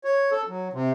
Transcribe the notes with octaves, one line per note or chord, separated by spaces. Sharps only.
C#5
A4
F#3
C3